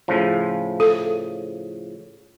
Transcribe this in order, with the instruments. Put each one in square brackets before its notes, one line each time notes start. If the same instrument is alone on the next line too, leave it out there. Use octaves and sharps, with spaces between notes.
[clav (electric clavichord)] A2 C#3 F3
[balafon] A4